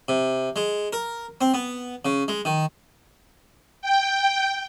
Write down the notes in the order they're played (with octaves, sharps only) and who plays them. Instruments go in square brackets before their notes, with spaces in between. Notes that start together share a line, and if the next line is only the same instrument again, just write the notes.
[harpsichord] C3
G#3
A#4
C4
B3
C#3
G#3
D#3
[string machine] G5